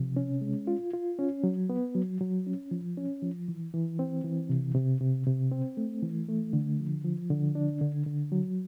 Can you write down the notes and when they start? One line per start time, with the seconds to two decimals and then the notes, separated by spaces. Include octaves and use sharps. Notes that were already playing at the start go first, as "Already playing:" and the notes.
Already playing: C3 F3
0.16 C#4
0.41 G#3
0.67 F4
0.94 F4
1.19 C#4
1.44 F#3
1.70 B3
1.95 F#3
2.21 F#3
2.46 C#4
2.71 F3
2.97 C#4
3.22 F3
3.48 E3
3.74 E3
3.99 C4
4.24 E3
4.49 C3
4.75 C3
5.01 C3
5.27 C3
5.52 C4
5.77 A3
6.03 E3
6.29 A3
6.53 D3
6.80 F3
7.04 F3
7.30 D3
7.55 D4
7.81 D3
8.06 D3
8.32 F#3